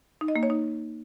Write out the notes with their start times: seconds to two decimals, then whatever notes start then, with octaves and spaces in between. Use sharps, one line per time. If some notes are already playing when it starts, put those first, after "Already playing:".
0.21 D#4
0.28 D#5
0.36 A#3
0.43 C#5
0.50 D#4